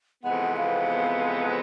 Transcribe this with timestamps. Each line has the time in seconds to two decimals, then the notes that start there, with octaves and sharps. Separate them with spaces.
0.24 F2 C3 E3 G#3 B3 F#5
0.57 F5